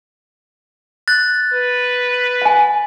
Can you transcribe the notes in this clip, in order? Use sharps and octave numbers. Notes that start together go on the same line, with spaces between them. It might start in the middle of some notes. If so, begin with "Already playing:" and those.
F#6 A6
B4
F#5 G#5